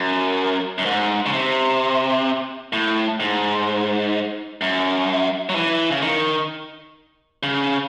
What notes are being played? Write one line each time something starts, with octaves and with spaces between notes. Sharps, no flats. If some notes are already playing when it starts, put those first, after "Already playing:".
Already playing: F#2
F#2
G#2
C#3
C3
A2
G#2
F#2
F#3
E3
C#3
D#3
C#3